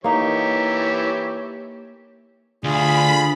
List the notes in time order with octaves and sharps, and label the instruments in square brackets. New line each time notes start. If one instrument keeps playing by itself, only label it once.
[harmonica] E3 G4 C#5 [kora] A#3 D#4
[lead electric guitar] D2 [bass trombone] D4 [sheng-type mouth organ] F4 G#4 [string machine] B5